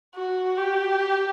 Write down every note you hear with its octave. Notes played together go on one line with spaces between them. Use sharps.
F#4
G4